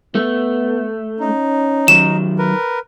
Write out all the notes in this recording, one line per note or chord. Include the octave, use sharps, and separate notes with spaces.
A3 B3
C#4 D#4
D#3 F#3 E7
A#4 B4